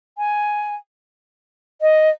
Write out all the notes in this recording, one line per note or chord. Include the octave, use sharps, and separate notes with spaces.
G#5
D#5